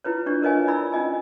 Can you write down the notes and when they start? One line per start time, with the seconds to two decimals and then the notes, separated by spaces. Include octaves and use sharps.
0.04 E4 F4 B4 C#5
0.26 D4 G4 C#5 D5 C#6
0.42 A#4 B4 C#5 D#5 F5 G#5
0.67 E4 D5 B5 E6
0.93 C#4 D#4 F4 D#5 G#5